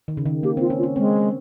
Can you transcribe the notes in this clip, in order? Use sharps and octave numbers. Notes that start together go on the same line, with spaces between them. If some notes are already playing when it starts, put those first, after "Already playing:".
D#3
C#3
D#3
A#3 G4
C4 F4
C#4
F4
C#4
G#3 C4